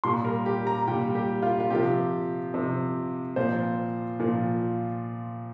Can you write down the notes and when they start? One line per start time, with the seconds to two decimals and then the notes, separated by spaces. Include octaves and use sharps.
0.04 A#2 G3 C6
0.25 A#4
0.46 G4
0.67 A#5
0.87 A#2 G3 G5
1.15 G4
1.42 F4
1.60 F4
1.70 C3 F3 G4
2.54 C3 F3
3.36 A#2 F3 C5
4.20 A#2 F3